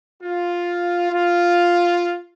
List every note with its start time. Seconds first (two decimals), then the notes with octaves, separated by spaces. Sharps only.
0.21 F4
1.11 F4